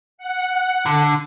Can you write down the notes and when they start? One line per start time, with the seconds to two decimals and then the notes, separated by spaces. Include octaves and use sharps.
0.18 F#5
0.86 D3